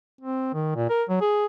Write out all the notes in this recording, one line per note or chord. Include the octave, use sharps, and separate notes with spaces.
C4
D#3
A#2
A#4
F#3
G#4